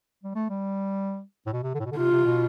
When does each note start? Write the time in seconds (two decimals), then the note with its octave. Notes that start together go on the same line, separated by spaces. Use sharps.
0.23 G3
0.35 A3
0.50 G3
1.46 A2
1.53 B2
1.63 C3
1.75 D3
1.80 A2
1.86 B2
1.91 D3
1.97 C3 F4
2.11 C3
2.26 B2